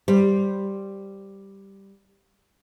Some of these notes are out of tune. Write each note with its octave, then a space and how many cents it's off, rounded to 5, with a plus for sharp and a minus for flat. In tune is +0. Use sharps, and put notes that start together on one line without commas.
G3 +0 C5 +0